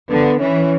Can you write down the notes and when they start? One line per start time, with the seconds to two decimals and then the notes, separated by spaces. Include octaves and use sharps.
0.09 D3 B3
0.39 E3 C#4